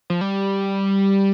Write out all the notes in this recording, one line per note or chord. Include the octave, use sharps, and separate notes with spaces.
F3
G3